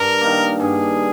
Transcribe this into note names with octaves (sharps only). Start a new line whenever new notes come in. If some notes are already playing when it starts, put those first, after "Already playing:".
Already playing: G2 A#4
D#3 A#3
G2 G#4